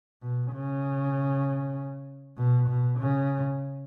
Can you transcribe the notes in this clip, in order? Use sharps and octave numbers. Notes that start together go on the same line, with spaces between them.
B2
C#3
B2
B2
C#3